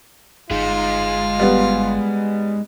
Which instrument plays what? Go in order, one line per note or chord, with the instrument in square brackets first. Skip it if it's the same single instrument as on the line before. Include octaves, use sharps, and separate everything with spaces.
[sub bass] G1 [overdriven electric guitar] G#3 D#4 [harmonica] F4
[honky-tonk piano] G3 B3